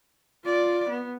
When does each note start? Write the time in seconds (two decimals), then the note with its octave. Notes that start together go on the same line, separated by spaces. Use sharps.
0.44 F4 D5
0.88 B3